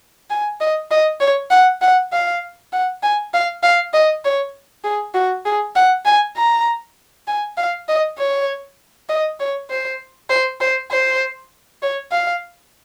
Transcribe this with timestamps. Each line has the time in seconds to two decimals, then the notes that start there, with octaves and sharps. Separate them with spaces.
0.30 G#5
0.60 D#5
0.91 D#5
1.20 C#5
1.51 F#5
1.82 F#5
2.13 F5
2.72 F#5
3.02 G#5
3.34 F5
3.63 F5
3.93 D#5
4.25 C#5
4.84 G#4
5.14 F#4
5.45 G#4
5.75 F#5
6.06 G#5
6.36 A#5
7.27 G#5
7.57 F5
7.88 D#5
8.18 C#5
9.09 D#5
9.39 C#5
9.70 C5
10.30 C5
10.61 C5
10.91 C5
11.82 C#5
12.12 F5